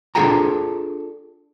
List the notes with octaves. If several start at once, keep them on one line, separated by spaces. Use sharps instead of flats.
D4 F4 G#4 A4 G5 A#5